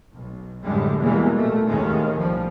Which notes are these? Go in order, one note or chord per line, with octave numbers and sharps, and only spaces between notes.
B1
F#2 A2 D3 G3 G#3
E2 B2 E3 G3 G#3 A#3
A#2 A3
D#2 A2 D#3 G#3 C#4
B1 F3 G3